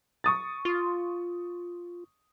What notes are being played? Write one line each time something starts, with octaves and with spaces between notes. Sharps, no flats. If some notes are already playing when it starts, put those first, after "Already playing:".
C#6 D#6 A6
F4